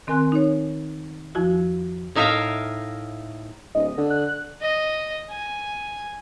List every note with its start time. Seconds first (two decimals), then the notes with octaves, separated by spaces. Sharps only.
0.07 D#3 C4 A#4 G#5 C6 F#6
0.32 D#4 C#5
1.35 F2 F3 E4 F#4
2.15 A2 D#4 A#4 E5 F5 A#5
3.75 D1 D#5
3.98 D3
4.10 F#6
4.62 D#5
5.31 G#5